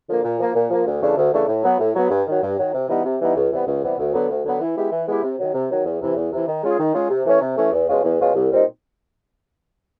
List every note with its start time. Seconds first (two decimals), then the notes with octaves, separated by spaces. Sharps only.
0.08 D3 F3 A#3
0.24 A#2
0.39 F3 A#3
0.54 A#2
0.70 F3 A#3
0.87 D2
1.02 C#3 E3 A3 D4
1.17 D2
1.32 C#3 E3 A3 D4
1.48 A2
1.64 F#3 B3
1.80 A2
1.95 F#3 B3
2.10 G2
2.27 D#3 F#3
2.42 G2
2.58 D#3 F#3
2.74 C3
2.89 E3 G3 B3 D#4
3.05 C3
3.20 E3 G3 B3 D#4
3.36 C#2
3.52 C3 E3 G3 B3
3.67 C#2
3.82 C3 E3 G3 B3
3.99 D2
4.14 D3 F#3 B3
4.29 D2
4.44 D3 F#3 B3
4.60 E3
4.76 G#3 B3 E4 G4
4.92 E3
5.07 G#3 B3 E4 G4
5.24 C3
5.38 D#3 F#3
5.54 C3
5.70 D#3 F#3
5.86 E2
6.01 C3 E3
6.16 E2
6.32 C3 E3
6.48 D#3
6.63 G#3 C#4 F4 G#4
6.79 D#3
6.94 G#3 C#4 F4 G#4
7.10 C3
7.26 E3 A3 C#4
7.41 C3
7.56 E3 A3 C#4
7.72 E2
7.88 B2 G#3 C#4 F4
8.04 E2
8.20 B2 G#3 C#4 F4
8.35 C2
8.51 A#2 G3 C4 D#4